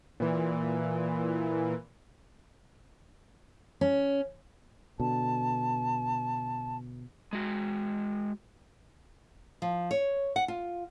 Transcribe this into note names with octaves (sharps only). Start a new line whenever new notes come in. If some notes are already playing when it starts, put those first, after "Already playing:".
A#2 E3
C#4
B2 D3 A5
G#3 F#4
F3
C#5
F#5
F4